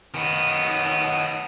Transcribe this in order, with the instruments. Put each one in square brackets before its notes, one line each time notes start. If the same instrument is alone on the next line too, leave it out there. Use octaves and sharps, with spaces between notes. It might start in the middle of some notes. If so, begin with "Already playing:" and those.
[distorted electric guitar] D#3 B3